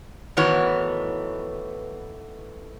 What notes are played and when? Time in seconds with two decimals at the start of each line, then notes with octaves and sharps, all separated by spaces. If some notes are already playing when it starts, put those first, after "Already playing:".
0.37 A2 D#3 E3 B3 F#4 C#5